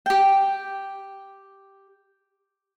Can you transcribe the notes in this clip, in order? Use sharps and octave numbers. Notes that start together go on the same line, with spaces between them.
G4 G5